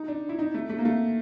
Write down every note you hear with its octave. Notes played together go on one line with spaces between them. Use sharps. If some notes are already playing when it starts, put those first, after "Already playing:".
Already playing: D#4
D4
E4
D#4
A3
A3
A#3
A3